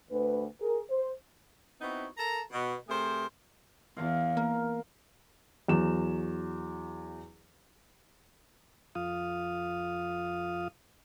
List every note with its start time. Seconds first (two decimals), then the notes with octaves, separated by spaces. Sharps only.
0.12 D2 B4
0.61 G#4 A#4
0.90 C5
1.81 B3 C4 D#4 E4 F#4
2.18 A4 A#4 A#5
2.52 B2
2.89 C3 A3 G#4 A#4 C5
3.97 E2 F5
4.37 A#3 A#4
5.68 E2 F#3 E7
8.95 F2 F4 F5 D#6